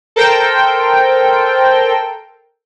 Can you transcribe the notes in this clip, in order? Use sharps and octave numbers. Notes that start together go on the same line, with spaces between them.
A4 A#4 C5 G5